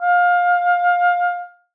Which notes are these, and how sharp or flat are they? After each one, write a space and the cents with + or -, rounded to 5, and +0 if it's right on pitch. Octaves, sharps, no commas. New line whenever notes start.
F5 +20